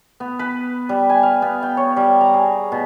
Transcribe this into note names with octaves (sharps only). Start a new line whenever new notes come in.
B3
B4
G3
G#5
F5
B3
G5
C#5
G3
A#5
G#4
B2